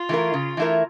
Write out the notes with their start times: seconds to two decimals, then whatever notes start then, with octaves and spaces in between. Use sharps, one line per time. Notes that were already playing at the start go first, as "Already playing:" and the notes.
Already playing: F4
0.09 E3 A3 E4 A#4
0.34 C#3
0.57 E3 A3 E4 A#4